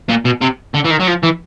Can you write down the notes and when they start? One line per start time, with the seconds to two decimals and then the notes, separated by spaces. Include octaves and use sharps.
0.09 A#2
0.25 B2
0.41 C3
0.74 D3
0.84 E3
0.90 D#3
1.00 F#3
1.07 F3
1.23 E3